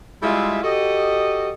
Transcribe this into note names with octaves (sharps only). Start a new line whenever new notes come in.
G3 G#3 E4 F4 G#4 E5
F#4 G4 A4 D#5